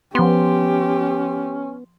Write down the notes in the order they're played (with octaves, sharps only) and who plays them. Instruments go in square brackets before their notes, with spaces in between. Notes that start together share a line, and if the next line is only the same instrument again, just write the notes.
[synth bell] F3 C6 [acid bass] B3 [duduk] C#4 [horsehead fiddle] G4